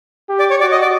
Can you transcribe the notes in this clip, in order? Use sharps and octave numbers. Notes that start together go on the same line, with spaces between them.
G4
D5
C#5
F#4 D5
D#5
D5